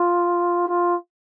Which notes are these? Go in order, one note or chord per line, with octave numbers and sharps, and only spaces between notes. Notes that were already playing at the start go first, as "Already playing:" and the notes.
Already playing: F4
F4